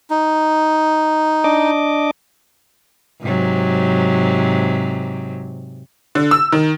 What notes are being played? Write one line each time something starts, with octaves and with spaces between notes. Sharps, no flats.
D#4
D4 D#5 D6
G#2 C3 F#3
D3
E6
D#3